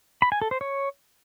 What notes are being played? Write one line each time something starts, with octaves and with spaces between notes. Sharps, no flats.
B5
G#5
A4
C5
C#5